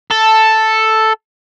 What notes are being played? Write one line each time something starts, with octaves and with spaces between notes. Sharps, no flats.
A4